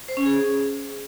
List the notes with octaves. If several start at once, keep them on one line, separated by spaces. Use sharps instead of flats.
C5
C#4
G#4